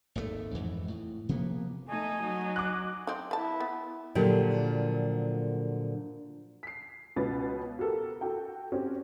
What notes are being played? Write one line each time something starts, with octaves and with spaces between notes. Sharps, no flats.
G#1 D#2 D#3 A3
F2 G#2 E3
A2
C3 F3 A#3 B3
A3 D#4 G#5
F#3 D#4
D6 F#6
C4 D#4
E4 B4 A5
B3
A#2 D3 F3 F#3 G4
B6 C7
C#2 B2 B3 C#4 A6
F#4 G4 A4 A#4
F#4 A4 G5
C4 C#4 F#4 G4